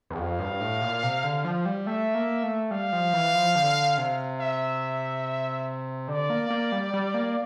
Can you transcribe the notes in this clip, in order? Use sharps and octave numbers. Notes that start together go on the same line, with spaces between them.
E2
F2 F5
G2
A2
A#2
C3
D3
F3
G3
A3 E5
A#3
A3
G3 F5
F3
E3
F3
D3
C3
E5
D3 D5
A#3
A#3
G3
G3
A#3